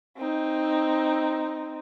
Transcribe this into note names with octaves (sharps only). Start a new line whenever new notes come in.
C4 D#4